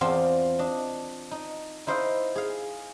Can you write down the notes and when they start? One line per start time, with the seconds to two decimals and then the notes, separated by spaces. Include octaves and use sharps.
0.01 E2 C4 F4 D5 A5
0.59 D4 D#5
1.31 D#4
1.87 D#4 E4 C5 D#5 F5 G5
2.35 G#4 F5